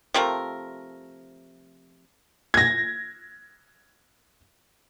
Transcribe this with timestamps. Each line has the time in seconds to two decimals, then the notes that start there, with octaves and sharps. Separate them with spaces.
0.14 C3 F3 A3 A#4
2.54 G#6 A#6